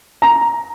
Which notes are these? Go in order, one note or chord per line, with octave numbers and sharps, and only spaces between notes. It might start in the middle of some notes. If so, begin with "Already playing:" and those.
A#5